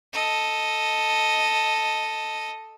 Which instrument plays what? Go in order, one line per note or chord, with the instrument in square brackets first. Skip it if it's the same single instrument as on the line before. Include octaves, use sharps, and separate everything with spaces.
[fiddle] A4 D#5